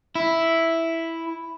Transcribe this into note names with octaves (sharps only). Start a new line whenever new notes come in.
E4